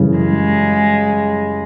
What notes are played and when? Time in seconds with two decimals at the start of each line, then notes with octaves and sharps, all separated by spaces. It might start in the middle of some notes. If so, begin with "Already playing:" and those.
Already playing: F#2 C#3 E3 G3
0.17 G#3